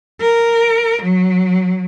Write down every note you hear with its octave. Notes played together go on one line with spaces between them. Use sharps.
A#4
F#3